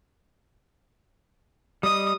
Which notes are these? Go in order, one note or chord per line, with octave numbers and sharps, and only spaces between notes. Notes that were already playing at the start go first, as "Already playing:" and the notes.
G3 D#5 D#6